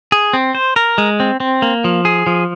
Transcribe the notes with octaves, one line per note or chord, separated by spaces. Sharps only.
G#4
C4
C5
A#4
G#3
C4
C4
A#3
F3
G#4
F3